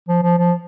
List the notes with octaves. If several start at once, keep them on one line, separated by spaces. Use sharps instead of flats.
F3
F3
F3